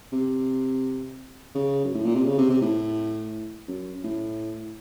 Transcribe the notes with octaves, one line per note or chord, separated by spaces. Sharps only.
C3
C#3
F#2
A2
A#2
C3
C#3
C3
C3
A2
F#2
A2